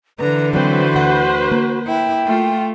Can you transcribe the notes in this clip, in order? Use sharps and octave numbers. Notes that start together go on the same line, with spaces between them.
D3 E3 B4 A#5
F#3 C4 F#4 B4 C5
D2 F#5
A#3
E4 G5
A3 F4